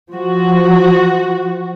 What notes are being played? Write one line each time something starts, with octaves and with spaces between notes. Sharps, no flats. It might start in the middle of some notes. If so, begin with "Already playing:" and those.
F3 F#4